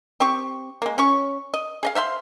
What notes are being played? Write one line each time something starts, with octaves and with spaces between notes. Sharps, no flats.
C4 G4 C#6
G#3 A#3
C#4 C#5 C#6
D#5
G#4 D#5 F5
C5 E5 F5 C6